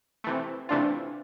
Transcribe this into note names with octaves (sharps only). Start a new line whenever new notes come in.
C3 E3 A3
C3 E3 A3 D4 F4